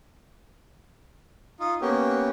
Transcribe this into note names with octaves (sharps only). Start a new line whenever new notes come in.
D#4 F4
A#3 B3 C#4 G4